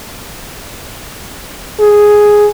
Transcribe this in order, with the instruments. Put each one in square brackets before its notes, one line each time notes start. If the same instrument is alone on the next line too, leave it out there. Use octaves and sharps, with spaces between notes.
[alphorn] G#4